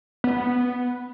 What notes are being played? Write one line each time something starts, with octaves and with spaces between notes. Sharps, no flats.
B3